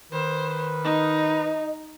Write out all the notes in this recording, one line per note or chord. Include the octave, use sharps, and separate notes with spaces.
D#3 B4 C5
D#4 D#5